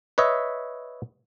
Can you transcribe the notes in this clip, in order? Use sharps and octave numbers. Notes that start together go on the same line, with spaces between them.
B4 C#5 D#5 E5